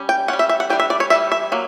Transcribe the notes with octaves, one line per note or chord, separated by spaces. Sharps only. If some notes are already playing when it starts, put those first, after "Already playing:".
Already playing: G3 C#4
G5
G3 C#4 F#5
E5
E5
F#5
E3 G3 D4 G5
E5
D5
C#5
E3 G3 E5
E5
F#3 A#3